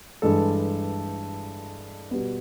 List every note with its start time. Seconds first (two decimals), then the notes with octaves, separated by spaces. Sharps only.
0.22 G2 E3 G#3 A4
2.11 B2 G3 B3